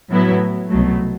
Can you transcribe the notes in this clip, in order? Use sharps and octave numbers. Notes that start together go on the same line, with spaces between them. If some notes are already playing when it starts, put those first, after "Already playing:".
A2 F#3 B3 E4
C2 B2 F#3 A3